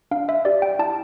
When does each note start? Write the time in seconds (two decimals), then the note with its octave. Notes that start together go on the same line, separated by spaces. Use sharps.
0.11 D4 F5
0.29 E5
0.45 G4 D5
0.62 G5
0.79 E4 A5